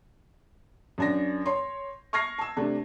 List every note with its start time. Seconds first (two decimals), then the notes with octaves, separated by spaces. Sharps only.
0.98 F#2 D4 A#6
1.46 C#5 C6
2.13 C#6 F6 G#6 A#6 C7
2.38 A5 E6
2.57 C3 A3 D4